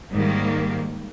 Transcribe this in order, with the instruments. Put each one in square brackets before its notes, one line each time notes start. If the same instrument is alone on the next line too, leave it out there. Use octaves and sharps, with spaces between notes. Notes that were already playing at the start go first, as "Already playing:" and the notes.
[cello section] G#2 D#3 G3 A#3